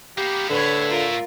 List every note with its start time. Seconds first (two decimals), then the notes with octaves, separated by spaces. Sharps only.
0.18 A#3 B3 G4
0.49 A2 D3 E4 B4 C#5
0.89 F4 A#4